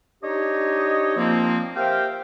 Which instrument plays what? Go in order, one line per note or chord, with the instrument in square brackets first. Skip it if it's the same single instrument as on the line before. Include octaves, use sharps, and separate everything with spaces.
[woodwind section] D4 D#4 G4 C#5 D#5
F3 A#3 C4
G4 A#4 C5 E5 F5 G5